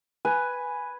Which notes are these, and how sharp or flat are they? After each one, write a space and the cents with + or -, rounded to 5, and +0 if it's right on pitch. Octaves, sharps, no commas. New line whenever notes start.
B4 +0 G#5 +0